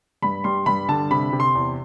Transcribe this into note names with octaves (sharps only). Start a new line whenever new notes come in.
G2 B5
G3 C6
G2 B5
D3 A5
C3 B5
C3
C6
E2